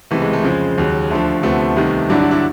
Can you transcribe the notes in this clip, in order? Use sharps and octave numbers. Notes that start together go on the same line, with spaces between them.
C#2 C3 E3 A3
G#3
A3
F2 C#3 F3 G#3
D#2 C#3 F#3
D2 D3 F3 A3
D2 C3 F3 A3 B3
C2 C3 D#3
G2 D3 F#3 D4 E4
E4 F#4
D4 E4